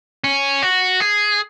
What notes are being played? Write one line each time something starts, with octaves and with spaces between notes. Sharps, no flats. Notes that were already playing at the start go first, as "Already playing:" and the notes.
C#4
F#4
G#4